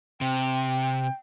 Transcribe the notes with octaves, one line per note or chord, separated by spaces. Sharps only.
C3 G5